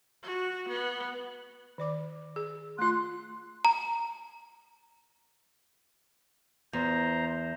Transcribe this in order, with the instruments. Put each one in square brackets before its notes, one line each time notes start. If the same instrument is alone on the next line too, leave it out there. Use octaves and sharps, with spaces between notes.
[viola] F#4
B3
[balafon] D#3 D5 D6
G#4
[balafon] A3 F4 [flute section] C6 F#6
[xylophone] A#5
[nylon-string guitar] E2 [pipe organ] C5 A#5